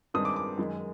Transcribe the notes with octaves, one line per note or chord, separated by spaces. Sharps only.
G2 D#3 G#3 C4 D#6
D6
D6
F#2 D#3 G#3